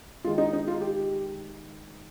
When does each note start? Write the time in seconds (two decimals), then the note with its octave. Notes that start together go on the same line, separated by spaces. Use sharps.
0.24 D#3 G#3 F4
0.38 D#4
0.53 D#4
0.68 F4
0.81 G4